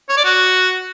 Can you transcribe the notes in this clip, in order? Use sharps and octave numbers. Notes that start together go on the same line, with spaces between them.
C#5
D5
F#4